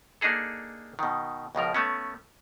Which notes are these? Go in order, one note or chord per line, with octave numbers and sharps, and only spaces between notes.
A#3 D4 D#4 G#4 A4
B2 D#3
C#2 B2 F3 A#4
A3 B3 C#4